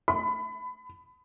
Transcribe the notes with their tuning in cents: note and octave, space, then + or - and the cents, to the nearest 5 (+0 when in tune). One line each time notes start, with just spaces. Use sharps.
B5 +25